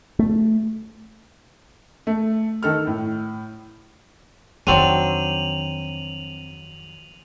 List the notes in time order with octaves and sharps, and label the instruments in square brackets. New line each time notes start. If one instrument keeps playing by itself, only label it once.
[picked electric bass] A3
[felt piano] A3
D#3 A4 F6
A2
[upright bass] F2 D#3 [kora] F#3 C4 D4 [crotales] D#7 F7 F#7